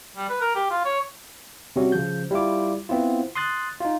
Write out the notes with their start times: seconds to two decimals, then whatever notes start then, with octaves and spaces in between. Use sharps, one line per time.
0.17 G3
0.30 B4
0.41 A#4
0.56 G4
0.71 F4
0.85 C#5
1.76 C3 G3 C#4 F#4
1.92 C#3 F3 G6
2.31 G3 E4 F4 D6
2.89 B3 C4 E4 F4
3.35 C6 D#6 F#6 A6
3.80 D#4 F4